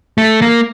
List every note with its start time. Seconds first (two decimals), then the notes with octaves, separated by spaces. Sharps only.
0.18 A3
0.42 A#3